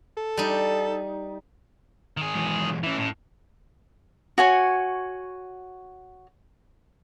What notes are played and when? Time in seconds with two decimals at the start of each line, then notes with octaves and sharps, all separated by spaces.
0.17 A4
0.37 G3 D#4
2.17 D#3 G#4
2.35 E3 F#3 G#3
2.83 E3 C#4 E4
2.97 A2
4.38 F#4 C#5 G#5